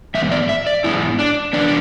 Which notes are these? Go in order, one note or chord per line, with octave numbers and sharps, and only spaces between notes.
G#2 E3 B3 E5
D5
E5
D5
G#2 E3 B3 E4
D4
E3 B3 D4